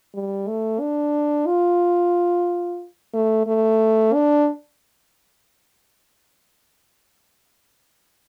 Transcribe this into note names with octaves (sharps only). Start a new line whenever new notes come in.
G3
A3
D4
F4
A3
A3
D4